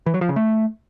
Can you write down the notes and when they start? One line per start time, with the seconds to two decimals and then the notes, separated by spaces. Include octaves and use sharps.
0.06 E3
0.14 F#3
0.21 F3
0.29 C#3
0.36 A3